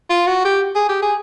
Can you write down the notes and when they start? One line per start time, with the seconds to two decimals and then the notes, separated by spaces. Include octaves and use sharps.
0.10 F4
0.27 F#4
0.45 G4
0.76 G#4
0.89 G4
1.02 G#4